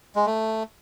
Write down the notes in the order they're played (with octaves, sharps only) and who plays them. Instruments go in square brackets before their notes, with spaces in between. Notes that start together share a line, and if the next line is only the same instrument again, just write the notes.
[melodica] G#3
A3